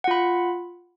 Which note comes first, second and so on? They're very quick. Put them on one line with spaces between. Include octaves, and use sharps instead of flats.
F#5 F4 B5